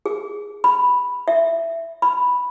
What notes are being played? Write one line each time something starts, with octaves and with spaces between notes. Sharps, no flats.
G#4
B5
E5
B5